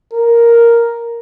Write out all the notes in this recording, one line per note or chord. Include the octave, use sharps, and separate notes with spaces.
A#4